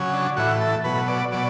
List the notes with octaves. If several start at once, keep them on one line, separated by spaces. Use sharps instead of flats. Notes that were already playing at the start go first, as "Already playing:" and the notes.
Already playing: C#3 F#3
D4
A2 E3 F#4
A4
B2 F#3 B4
D5
B2 F#3 D5